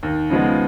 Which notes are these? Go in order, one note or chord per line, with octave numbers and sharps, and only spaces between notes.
D#2
C#3 F3 G#3 B3